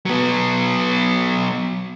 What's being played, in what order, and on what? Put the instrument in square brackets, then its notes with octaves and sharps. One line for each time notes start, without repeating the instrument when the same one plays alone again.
[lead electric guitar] F#3 B3